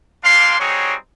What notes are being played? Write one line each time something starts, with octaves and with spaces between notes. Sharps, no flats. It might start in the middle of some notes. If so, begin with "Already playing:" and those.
G3 A#3 D4 F5 C6
G3 C4 D#4 F#4 G#4 C#5